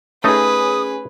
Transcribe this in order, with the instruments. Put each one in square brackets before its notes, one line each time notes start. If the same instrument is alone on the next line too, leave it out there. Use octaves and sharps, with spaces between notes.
[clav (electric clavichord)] A3 D#4 D#5 [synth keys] C#4 G#4 [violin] B4 [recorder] D#6